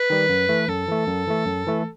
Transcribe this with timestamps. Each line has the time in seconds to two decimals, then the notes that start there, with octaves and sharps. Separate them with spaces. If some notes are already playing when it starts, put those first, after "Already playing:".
Already playing: B4
0.10 D#3 G3
0.29 F#2
0.49 E3 A3
0.68 F#2 A4
0.88 E3 A3
1.07 F#2
1.27 E3 A3
1.46 F#2
1.67 E3 A3